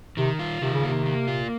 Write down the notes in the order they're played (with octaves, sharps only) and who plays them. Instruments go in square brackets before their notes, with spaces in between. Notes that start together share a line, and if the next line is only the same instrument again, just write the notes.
[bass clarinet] C3 [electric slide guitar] D#3
[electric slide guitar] F4
[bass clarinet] C3 [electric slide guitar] D#3
[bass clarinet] C#3
[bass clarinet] C3 [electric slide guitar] A#3
[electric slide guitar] A#3
F4